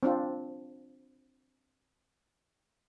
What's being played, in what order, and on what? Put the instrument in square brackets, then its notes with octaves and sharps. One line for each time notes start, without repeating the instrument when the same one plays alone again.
[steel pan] C4 D4 F4